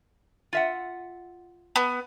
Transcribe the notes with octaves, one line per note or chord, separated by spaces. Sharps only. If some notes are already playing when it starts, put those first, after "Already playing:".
F4 E5 F#5
B3